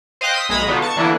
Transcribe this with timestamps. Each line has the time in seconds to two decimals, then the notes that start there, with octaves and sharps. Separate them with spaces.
0.21 C5 D#5 F5 G5 F#6
0.33 C6 D#6 E6 B6 C7
0.49 B1 G#3 A#5 B5 D#6 G#6
0.68 D3 B3 D#4 F4 F#4
0.82 A5 C#6 C#7
0.96 D3 E3 A#3 B3 D4 E4